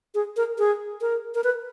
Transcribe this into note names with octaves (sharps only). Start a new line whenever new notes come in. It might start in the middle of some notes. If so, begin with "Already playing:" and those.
G#4
A#4
G#4
A#4
A#4
B4